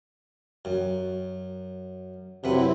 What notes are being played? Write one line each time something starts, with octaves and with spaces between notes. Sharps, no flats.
F#2
F#2 C3 C4 E4 B4 F#5